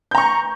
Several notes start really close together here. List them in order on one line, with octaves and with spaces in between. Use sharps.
G6 A#5 C#6